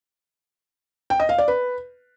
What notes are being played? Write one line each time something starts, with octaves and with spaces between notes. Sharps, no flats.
G5
D#5
F5
D5
B4